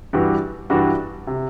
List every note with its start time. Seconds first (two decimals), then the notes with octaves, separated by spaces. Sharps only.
0.13 G2 E3 G3 D4 F#4
0.70 G2 E3 G3 D4 F#4
1.27 C3